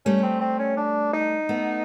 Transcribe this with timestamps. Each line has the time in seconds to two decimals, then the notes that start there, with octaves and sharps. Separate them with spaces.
0.05 G3 A3 C#4
0.23 C4
0.41 C4
0.59 C#4
0.77 D4
1.13 D#4
1.49 A3 B3